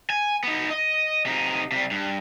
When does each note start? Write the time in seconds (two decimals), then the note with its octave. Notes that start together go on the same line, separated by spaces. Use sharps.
0.10 G#5
0.44 B3 D#4
0.71 D#5
1.26 C3 D#4
1.72 C3 G3
1.91 G2